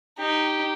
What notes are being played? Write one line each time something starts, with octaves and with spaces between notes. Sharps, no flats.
D#4 G4